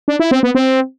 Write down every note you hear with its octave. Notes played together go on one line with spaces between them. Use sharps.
D4
E4
C4
B3
C4